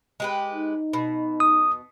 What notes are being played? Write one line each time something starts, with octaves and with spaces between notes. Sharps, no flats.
G#3 G4 B4
D#4
B2
D#6